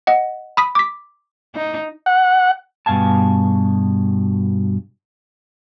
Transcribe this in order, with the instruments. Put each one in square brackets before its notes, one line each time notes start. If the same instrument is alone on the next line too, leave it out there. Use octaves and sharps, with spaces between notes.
[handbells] D#5 F#5
B5 D#6 B6
D6 B6
[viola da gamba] D#4
[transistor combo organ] F#5
[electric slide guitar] G2 B2 F5 G#5 A5